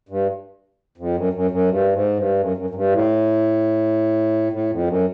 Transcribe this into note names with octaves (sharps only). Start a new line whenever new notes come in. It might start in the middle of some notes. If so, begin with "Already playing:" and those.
G2
F2
F#2
F#2
F#2
G2
G#2
G2
F#2
F#2
F#2
G2
A2
A2
F2
F#2